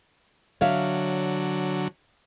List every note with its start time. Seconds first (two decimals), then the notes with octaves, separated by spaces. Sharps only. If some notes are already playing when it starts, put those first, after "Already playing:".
0.61 D3 F#3 C#5 E5 F5